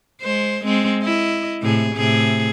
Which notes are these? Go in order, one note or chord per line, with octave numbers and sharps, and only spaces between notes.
G#3 C5
G#3 C4
E4 D#5
A2 C3 G#4
A2 C3 G#4